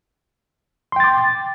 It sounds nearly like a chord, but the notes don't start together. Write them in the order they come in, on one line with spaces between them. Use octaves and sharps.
C6 G5 A6 D6